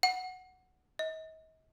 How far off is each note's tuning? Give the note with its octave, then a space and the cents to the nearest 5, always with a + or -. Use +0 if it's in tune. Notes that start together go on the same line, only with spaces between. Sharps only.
F#5 +0
D#5 +40